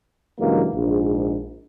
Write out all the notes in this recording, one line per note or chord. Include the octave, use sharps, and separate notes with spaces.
G2 C#3 E3 F#3 G#3 A#3
A#1 G#2